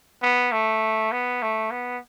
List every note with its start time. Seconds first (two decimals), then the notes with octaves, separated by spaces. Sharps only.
0.22 B3
0.52 A3
1.12 B3
1.42 A3
1.71 B3